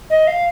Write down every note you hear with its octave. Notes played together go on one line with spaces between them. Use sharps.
D#5
F5